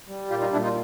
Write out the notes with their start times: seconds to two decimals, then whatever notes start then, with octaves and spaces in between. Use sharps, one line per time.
0.08 G3
0.30 A#2 F4 G4
0.41 D#4 F4
0.52 A#2 D4 E4
0.63 D#4 F4